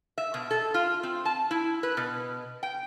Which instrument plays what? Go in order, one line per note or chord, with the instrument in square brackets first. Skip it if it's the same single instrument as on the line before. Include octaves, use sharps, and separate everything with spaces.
[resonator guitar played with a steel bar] E5
B2
A4
F4
C4
A5
E4
B4
B2
G5